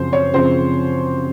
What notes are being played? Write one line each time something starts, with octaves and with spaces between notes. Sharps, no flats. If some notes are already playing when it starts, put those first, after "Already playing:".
Already playing: F#2 C#3 F3 C4 C5
C#5
F#2 C#3 F3 C4 C5